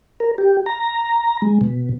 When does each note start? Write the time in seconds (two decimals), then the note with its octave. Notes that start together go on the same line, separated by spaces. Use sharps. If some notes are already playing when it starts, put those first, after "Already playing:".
0.20 A#4
0.38 G4
0.66 A#5
1.42 G#3
1.61 B2